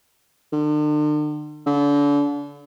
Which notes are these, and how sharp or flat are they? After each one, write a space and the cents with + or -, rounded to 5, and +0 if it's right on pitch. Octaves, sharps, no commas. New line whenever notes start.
D3 +40
D3 -35